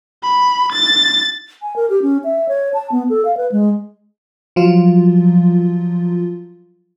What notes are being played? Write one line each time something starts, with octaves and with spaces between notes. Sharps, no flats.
B5
A6
G#5
A#4
G4
C#4
E5
C#5
A5
B3
A4
F5
B4
G#3
F3 F#3 F4